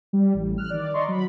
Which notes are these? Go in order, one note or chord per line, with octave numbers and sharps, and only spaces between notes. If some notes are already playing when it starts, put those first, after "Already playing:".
G3
A1
F6 F#6
D#3 D5
D5 D#5 A#5 C6 C#6
F#3 B5